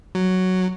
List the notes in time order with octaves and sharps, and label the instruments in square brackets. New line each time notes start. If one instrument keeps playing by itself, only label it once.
[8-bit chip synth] F#3